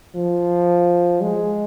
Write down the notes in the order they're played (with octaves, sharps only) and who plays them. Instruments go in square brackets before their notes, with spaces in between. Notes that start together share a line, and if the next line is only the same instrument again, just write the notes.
[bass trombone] F3
G#3